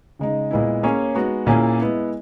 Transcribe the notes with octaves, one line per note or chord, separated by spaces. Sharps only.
C#3 G#3 D#4
A#2 G#3 B3 E4
A#3 C#4 G#4 C#5
G#3 B3 D#4 F#4
A#2 A#3 C#4 E4 G#4
G#3 B3 E4